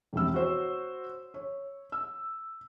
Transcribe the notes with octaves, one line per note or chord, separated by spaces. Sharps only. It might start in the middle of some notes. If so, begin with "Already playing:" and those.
E1 C3 E3 E6
F#4 C5 C#5
C#5
E6